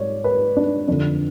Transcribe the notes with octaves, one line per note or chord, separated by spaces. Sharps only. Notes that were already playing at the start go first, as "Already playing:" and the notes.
Already playing: G#2 C#5 D5
B4
D4
F2 D3 D4